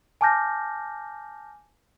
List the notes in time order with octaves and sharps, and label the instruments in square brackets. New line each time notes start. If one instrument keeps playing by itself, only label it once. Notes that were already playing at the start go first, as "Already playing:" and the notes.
[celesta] G#5 A5 D6 F6 G6 A#6